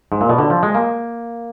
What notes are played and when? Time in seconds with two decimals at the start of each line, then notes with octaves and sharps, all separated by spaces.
0.12 G#2
0.21 A#2
0.29 B2
0.38 D3
0.50 F3
0.63 G#3
0.74 A#3